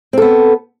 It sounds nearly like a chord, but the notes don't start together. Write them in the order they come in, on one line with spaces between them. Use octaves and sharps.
C4 A4 B3